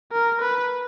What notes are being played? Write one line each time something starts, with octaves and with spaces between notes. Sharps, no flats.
A#4
B4